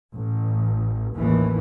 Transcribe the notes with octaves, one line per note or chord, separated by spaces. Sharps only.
A1
A1 D#2 A2 E3